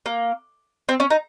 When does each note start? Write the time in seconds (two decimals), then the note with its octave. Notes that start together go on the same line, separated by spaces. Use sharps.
0.06 A#3
0.89 C4
1.00 C#4
1.10 D#4